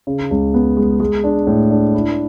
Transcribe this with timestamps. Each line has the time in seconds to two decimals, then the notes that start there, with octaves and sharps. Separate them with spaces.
0.07 C#3
0.31 C#2
0.54 B3
0.77 G#3
1.00 G#3
1.24 D4
1.47 A2
1.71 D4
1.94 E4